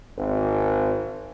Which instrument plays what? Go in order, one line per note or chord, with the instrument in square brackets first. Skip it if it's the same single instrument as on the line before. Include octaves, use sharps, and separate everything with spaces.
[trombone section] G#1